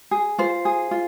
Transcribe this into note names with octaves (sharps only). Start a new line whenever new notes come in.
G#4
F4 C5
G#4
F4